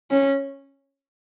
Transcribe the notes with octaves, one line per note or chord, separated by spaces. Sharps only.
C#4